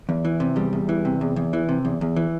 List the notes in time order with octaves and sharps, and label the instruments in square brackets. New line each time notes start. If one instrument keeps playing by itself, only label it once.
[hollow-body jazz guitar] E2
E3
C3
E2 G3
E2
E3
C3
E2
E2
E3
C3
E2
E2
E3